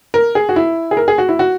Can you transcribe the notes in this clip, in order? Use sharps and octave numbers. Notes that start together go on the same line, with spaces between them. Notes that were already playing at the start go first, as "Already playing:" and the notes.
A#4
G#4
F#4
E4
G#4
A#4
G#4
F#4
E4
F#4